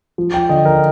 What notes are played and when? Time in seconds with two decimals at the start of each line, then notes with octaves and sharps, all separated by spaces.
0.18 F3
0.34 G5
0.49 D3 D#5
0.65 A#4